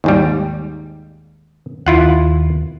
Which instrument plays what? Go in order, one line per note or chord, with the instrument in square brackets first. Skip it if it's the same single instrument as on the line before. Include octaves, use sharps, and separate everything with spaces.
[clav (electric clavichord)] D#2 G#2 G3
[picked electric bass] D#2 [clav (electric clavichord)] E4 F4 F#5